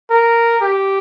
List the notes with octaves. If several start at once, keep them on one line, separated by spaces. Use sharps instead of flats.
A#4
G4